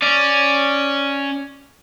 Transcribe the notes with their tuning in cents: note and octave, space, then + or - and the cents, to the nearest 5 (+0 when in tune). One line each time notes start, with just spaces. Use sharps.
C#4 +0 D5 +0